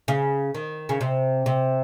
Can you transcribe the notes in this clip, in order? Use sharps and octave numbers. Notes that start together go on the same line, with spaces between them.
C#3
D#3
C#3
C3
C3